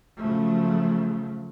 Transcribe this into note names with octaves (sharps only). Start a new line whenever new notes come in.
C#3 F3 F#3 A3